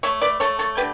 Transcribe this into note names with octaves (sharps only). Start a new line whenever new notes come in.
A3 C#5 E5
B4 D5
A3 A4 C#5
A4 C#5
D3 G4 B4